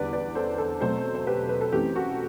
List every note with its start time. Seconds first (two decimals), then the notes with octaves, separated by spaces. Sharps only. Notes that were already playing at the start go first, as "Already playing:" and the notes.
Already playing: E2 D3 G3 B4 D5
0.13 B4 D5
0.35 A4 C5
0.58 A4 C5
0.81 B2 F#3 A3 C4 A4 C5
1.15 C5
1.27 G4 B4
1.49 B4
1.61 A4
1.72 F#2 E3 A3 C4 G4
1.95 F#4 A4